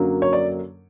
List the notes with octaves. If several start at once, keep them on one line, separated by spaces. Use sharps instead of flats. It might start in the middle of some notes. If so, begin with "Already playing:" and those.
Already playing: F#2 D3 F#3 A#3
C#5
D5